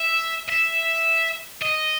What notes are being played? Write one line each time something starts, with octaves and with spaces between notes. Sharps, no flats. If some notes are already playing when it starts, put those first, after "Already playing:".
Already playing: E5
E5
D#5